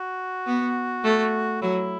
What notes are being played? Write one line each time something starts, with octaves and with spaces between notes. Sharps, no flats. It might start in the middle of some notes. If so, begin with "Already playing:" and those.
Already playing: F#4
B3
A3
F#3 E4